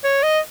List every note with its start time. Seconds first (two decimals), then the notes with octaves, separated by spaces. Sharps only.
0.04 C#5
0.23 D#5